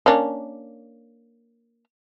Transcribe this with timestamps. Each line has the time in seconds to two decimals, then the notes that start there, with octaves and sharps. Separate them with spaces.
0.06 A#3 C#4 D4